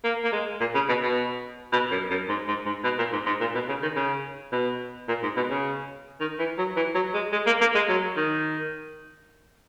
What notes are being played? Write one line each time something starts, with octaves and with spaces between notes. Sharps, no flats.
A#3
A#3
G#3
A#2
C#3
B2
B2
B2
F#2
F#2
G#2
G#2
G#2
B2
A#2
G#2
G#2
A#2
B2
C#3
D#3
C#3
B2
A#2
G#2
B2
C#3
D#3
E3
F#3
E3
F#3
G#3
G#3
A#3
A#3
G#3
F#3
D#3